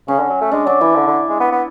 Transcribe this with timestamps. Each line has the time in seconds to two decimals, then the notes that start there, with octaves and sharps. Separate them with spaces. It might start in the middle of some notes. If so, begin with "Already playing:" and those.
0.08 C#3 C#4
0.19 D3
0.30 F#3
0.41 A3
0.51 G#3 D4
0.66 F#3 D4
0.81 E3 E4
0.96 D3
1.07 D3
1.29 G#3
1.40 B3
1.52 B3